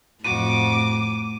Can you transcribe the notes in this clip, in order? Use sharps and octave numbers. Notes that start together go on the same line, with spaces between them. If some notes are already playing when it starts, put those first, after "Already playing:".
F2 A2 F#4 D6 D#7